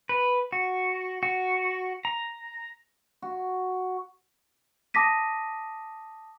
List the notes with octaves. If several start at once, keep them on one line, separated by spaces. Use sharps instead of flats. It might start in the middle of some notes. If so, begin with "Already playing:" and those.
B4
F#4
F#4
A#5
F#4
A5 D6 D#6 A#6 B6 D#7